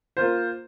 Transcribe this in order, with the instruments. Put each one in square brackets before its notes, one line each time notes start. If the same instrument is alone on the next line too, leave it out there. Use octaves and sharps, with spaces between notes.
[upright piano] A#3 F4 C5